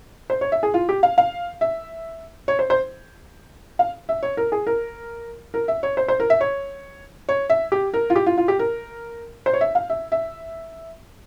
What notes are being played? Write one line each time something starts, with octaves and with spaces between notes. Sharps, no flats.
C5
C#5
E5
G#4
F4
G4
F5
F5
E5
C#5
C5
C5
F5
E5
C#5
A#4
G#4
A#4
A#4
E5
C#5
C5
C5
A#4
E5
C#5
C#5
E5
G4
A#4
F4
G4
F4
F4
G4
A#4
C5
C#5
E5
F5
E5
E5